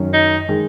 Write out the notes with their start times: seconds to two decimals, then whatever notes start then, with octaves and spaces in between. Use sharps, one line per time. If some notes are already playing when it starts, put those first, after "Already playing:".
Already playing: F#2 D#3 F#3 C#4
0.13 D#4
0.49 D#3 G#3